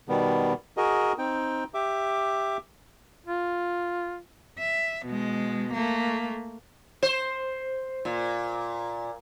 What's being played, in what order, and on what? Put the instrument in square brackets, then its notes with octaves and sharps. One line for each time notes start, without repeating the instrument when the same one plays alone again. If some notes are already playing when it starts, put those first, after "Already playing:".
[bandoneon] B2 D#3 G3 B3
F#4 G#4 A#4 D#5
C4 D#4 G5
G4 E5 D6
[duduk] F4
[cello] E5
B2 G#3
A3 A#3
[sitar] C5
A#2